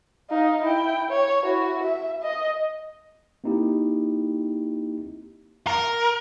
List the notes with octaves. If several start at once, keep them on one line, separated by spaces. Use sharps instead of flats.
D#4 F5
E4 G5
C#5
E4 F#4
E5
D#5
A#3 C4 D#4 E4 G4
A#4